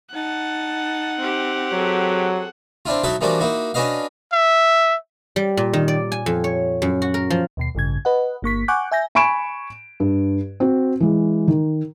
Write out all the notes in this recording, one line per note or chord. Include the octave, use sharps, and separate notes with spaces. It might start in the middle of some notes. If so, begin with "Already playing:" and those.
D#4 F#5 A5
C4 G4
F#3 G#4 A4
C4 D4 E4 F4
F#3 D#4 E4 A4 E5 F#5
E3 F3 G3 A#3 D4 F#4
A#3 D#4 E4 F#4
C#4 D4 F#4 B4 D#5 F5
E5
G3
A#2
D#3
D5
G#5
F2
C#5
F#2
F#4
A#4
F3
D#2 B2 C7
A1 G2 C#3 G#6
B4 D#5 F#5
G1 A#3 C#6 B6
F#5 G#5 C#6 D6 F#6 G6
E5 G#5 G6 A#6
G#5 B5 C#6 D7 E7
G2
C4 F#4
E3 G#3
D#3